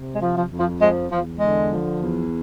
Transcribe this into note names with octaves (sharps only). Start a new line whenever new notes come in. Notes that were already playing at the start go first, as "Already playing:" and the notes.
Already playing: C3
G#3
F3
F3
F2
F3
F3 G#3
E2 F3
D3 G#3
F3
E2